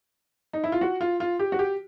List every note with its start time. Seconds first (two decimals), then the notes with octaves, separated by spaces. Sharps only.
0.53 D#4
0.64 E4
0.72 F4
0.81 F#4
1.01 F4
1.20 F4
1.39 G4
1.52 F#4
1.59 G4